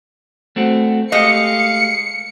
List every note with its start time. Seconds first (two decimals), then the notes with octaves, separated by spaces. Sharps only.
0.56 A3 C4 F#4
1.12 G#3 A3 G4 D#5 F5 C#7